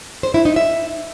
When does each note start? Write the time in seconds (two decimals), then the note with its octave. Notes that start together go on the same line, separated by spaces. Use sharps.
0.23 C5
0.34 E4
0.45 D#4
0.56 E5